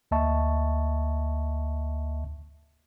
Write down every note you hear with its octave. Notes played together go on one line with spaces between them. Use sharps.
D2 A#3 D#5 E5 A5 C#6